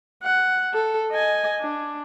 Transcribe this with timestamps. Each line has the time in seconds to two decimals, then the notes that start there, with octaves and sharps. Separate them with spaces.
0.23 F#5
0.74 A4
1.12 D#5 G#5
1.60 D4